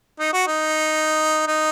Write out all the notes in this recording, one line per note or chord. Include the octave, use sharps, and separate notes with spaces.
D#4
F#4
D#4
D#4